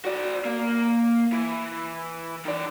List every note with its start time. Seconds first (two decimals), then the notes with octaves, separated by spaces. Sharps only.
0.05 F#4 D5
0.45 A#3
1.32 E3
2.46 D#3 D5